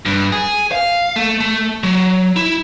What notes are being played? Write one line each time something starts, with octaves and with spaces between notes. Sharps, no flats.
G2
G#4
F5
A3
A3
F#3
E4